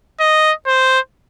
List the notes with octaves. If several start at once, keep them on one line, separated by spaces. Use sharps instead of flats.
D#5
C5